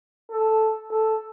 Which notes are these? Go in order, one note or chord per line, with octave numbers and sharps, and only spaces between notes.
A4
A4